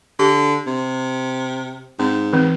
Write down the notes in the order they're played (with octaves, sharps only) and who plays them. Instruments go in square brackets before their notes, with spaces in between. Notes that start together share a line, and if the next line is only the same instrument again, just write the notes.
[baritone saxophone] D3 [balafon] G4
[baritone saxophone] C3
[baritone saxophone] G#2 [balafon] C4
[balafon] E3 C4